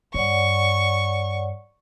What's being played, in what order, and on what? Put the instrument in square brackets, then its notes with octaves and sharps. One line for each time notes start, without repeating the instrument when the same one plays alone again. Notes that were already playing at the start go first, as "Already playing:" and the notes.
[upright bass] G2 [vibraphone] C#5 D5 F#5 [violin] C#6